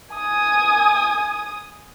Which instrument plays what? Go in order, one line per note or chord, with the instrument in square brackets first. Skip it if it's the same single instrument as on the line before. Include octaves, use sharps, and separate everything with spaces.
[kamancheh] G#5 D#6